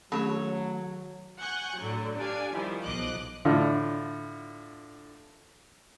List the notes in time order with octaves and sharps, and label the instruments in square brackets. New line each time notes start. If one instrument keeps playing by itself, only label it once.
[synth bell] D#3 [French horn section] F#3 [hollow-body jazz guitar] A3 C#4 B5 [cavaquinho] A4 C#5
[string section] F#5 G#5 C#6 F#6 G6
A2 D3 F#3
D4 G4 D5 F5 G#5
D#3 F3 G3 E4
B1 F3 D#5 D6 F#6
[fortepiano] A2 D3 F4